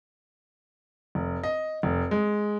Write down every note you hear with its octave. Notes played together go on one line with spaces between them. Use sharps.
F1
D#5
F1
G#3